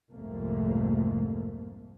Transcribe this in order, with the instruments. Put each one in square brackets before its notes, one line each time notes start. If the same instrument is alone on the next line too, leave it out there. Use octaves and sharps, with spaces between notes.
[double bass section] F1 C2 F2 G#2 A3 A#3